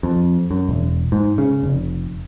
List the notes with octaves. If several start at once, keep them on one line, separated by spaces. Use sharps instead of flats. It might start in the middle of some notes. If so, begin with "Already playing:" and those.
F2
F#2
E1
G#2
C#3
F1